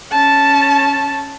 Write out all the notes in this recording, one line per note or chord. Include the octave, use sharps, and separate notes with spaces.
C#4 A5